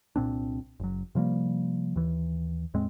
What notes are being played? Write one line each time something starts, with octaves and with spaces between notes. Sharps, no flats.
C2 A#2 C4 D4
F#1 F#3
C3 F3 G3 A#3
D#2 E3
E2 A2 G#3 C4